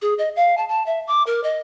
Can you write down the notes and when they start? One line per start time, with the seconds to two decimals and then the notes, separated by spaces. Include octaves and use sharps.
0.02 G#4
0.18 D#5
0.36 F5
0.57 A5
0.69 A5
0.86 E5
1.07 D6
1.27 A#4
1.43 D#5